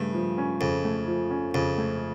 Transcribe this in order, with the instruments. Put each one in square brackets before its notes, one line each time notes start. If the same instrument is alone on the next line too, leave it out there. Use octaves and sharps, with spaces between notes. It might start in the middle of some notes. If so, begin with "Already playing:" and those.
Already playing: [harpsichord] G2 [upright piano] C#3 A3
[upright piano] F3
C#4
[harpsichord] F2 [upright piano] C#3
[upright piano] A3
F3
C#4
[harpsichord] F2 [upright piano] C#3
[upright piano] A3